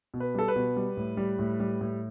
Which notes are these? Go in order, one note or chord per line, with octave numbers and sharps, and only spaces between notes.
B2
B4
G3 A4
B4
B2
G3
A2
G3
A2
G3
A2